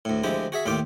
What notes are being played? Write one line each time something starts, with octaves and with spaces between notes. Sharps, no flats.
D2 A2
D2 F3 G#3 E4 G4
F#4 G#4 E5
D#2 A2 F4 G4 D6